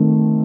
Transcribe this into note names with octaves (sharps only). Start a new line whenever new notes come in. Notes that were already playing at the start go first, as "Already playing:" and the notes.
Already playing: D#3 A3 C4